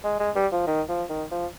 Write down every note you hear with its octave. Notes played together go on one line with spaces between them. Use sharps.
G#3
G#3
G3
F3
D#3
F3
D#3
F3